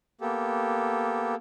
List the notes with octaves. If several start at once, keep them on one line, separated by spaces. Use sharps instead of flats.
A#3 B3 G4 A4